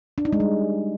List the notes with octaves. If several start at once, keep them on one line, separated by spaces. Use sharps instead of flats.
D4
D#4
G#3
G3